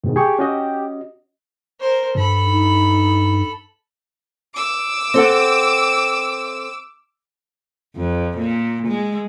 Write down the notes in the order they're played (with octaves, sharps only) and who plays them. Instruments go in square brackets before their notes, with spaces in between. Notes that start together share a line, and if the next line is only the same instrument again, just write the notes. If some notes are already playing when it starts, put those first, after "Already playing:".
[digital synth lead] G#2 [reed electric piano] B2 D#3
[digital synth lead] G4 [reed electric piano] G#4 G5 C#6
[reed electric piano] C#4 F#4 D#5
[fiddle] A#4 C5
[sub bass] G2 [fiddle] A4 B5
[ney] D#4
[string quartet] D6 E6
[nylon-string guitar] C4 A4 F#5
[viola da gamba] F2
A#2
G#3